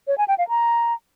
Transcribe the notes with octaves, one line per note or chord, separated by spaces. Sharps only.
C#5
G#5
G5
F5
A#5